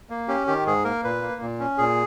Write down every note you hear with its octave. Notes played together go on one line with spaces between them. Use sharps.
A#3
C#4 G4
D#3 G4
G#2 G#4
A#3 A#4
A#2 B4
A#3
A#2
C#4
A#2 G#4